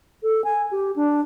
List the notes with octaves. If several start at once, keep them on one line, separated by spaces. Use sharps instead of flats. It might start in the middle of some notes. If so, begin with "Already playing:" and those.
A4
G#5
G4
D4